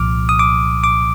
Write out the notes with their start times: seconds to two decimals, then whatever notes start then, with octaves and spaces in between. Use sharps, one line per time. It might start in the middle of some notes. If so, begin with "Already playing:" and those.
Already playing: C2 A#2 F3 D6 F6
0.29 D#6
0.39 D6
0.84 D6